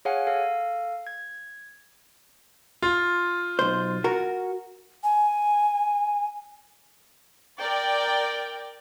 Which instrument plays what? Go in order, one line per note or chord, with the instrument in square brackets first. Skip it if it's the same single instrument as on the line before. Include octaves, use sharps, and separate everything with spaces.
[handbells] G#4 C#5 F5 F#5 G#5
A4 F5
G#6
[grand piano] F4
[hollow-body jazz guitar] B1 C5
F#4 A#4
[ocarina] G#5
[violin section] A#4 D5 G5